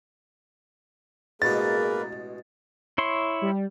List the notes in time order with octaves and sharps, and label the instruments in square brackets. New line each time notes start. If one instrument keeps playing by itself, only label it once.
[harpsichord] A1 B2 G#3 [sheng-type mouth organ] A#3 A#4 B4 [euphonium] G#4 [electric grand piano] A6
[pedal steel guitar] E4 C#5 C6
[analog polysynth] G3